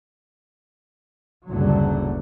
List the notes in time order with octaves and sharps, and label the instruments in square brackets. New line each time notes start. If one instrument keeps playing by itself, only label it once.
[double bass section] F#1 D2 A2 D3 F#3 G3